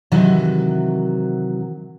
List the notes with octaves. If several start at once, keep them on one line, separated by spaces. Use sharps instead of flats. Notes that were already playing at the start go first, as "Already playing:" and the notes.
C3 D#3 E3 F#3